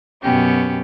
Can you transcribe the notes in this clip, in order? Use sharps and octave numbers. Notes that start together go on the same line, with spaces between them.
F#2 B2 B3 C#4 G4 G5